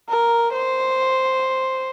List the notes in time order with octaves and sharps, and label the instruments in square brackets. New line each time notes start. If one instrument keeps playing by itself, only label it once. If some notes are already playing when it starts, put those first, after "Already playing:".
[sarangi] A#4
C5